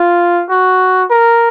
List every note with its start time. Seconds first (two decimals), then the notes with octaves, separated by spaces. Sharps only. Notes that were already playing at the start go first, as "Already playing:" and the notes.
Already playing: F4
0.49 F#4
1.10 A#4